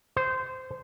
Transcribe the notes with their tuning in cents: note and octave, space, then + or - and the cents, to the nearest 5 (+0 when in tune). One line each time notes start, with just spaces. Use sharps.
C5 -15